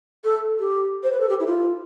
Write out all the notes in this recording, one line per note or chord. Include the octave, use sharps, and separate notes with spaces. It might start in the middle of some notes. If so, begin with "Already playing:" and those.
A4
G4
C5
B4
A4
G4
E4
F4